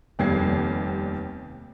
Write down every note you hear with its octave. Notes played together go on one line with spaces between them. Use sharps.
F1 D#2 G3 B3 G#6 C7